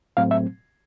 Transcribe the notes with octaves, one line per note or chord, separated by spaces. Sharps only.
A2 F#3 A3 C4 F5
E5